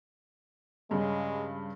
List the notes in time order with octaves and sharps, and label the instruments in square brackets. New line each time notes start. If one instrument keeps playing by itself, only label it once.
[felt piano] G2 C#3 [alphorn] G#3